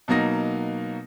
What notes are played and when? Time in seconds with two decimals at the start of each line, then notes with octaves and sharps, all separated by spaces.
0.08 B2 F#3 A#3 D#4 A#6